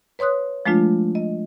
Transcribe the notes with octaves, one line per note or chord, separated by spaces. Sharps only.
B4 C#5 C6 D#6 F#6
F3 G#3 A3 D4 F4
D#5